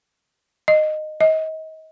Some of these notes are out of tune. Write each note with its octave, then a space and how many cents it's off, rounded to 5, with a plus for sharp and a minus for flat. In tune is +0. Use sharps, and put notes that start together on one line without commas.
D#5 -15
D#5 +30